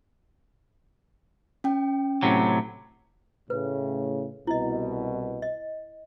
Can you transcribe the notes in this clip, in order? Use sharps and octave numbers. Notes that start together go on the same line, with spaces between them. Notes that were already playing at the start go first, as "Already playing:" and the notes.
C#4 G5
A2 C3 F#3
A2 C#3 B4
C2 B2 E4 D#5
D#5